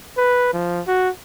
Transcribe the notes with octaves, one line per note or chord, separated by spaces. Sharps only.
B4
F3
F#4